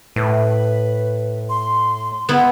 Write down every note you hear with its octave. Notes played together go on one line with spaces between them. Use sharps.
A2 B4
C6
B3 E4